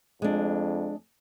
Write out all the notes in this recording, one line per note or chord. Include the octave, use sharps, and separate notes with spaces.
F2 G#3 D4